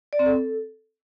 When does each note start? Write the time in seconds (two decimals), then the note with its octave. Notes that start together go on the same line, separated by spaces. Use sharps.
0.13 D5
0.19 C4
0.26 A4